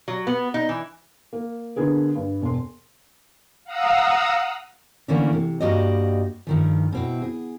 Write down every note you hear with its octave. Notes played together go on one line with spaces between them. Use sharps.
F#3
B3
D#4
E3
A#3
D3 B3 G#4 A#4
G2
E1 C6
F5 F#5 A#5 D#6 E6
D3 E3 A3 A#3 C#4 D4
C3
G2 A#3 F#4 G4 D5 D#5
G2 D#3 F3
B2 C4 E4
G#4